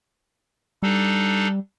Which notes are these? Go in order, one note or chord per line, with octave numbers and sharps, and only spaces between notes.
G3 D4 D#4 A4